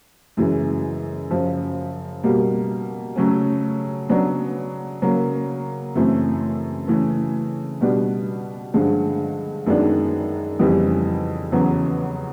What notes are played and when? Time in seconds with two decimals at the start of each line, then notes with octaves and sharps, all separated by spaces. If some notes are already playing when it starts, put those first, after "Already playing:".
0.37 F#2 C#3 E3 G#3
1.30 F#2 C#3 F3
2.23 B2 G3 A#3
3.16 C#3 F#3 A3 C#4
4.09 C#3 F#3 B3 D4
5.02 C#3 F#3 A#3
5.95 F#2 C#3 E3 A3 C4
6.88 C#3 E3 A3
7.81 B2 G3 B3 D4
8.74 G2 D3 F3 G#3
9.66 F#2 D#3 G#3 B3 D4
10.59 F2 C#3 E3 G3 B3
11.52 E2 C#3 F#3 B3